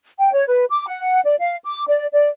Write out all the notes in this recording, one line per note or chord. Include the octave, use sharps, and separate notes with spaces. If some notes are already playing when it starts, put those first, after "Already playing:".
G5
C#5
B4
D6
F#5
D5
F5
D6
D5
D5